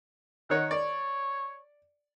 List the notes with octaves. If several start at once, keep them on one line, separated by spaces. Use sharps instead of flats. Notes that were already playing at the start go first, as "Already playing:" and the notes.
D#3 D#4 C#5 F#5
C#5 D5